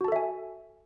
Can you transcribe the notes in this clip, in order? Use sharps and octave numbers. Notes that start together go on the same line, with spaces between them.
F#4 A4 E5 G#5 A5